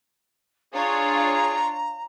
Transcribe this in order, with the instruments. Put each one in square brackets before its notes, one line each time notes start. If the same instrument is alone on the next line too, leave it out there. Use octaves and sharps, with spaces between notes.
[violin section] D4 F4 C#5 [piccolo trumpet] G#4 [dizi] A#5